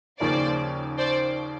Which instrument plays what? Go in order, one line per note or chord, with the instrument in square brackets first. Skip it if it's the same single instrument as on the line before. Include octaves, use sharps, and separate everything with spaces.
[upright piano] D#2 C#3 F3 A#3 C#4 [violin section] C5 D5
[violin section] C5 D5